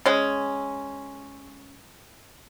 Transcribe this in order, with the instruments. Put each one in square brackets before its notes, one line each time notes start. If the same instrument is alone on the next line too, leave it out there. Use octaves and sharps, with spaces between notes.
[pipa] G#3 C#4